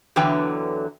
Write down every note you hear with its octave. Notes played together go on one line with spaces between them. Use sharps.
E2 D3 E3 F#3 B4 G5